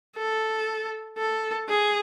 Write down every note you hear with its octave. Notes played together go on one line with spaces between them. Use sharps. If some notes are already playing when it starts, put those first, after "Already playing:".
A4
A4
G#4